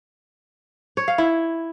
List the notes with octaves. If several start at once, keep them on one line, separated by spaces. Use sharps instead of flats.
C#5
F5
E4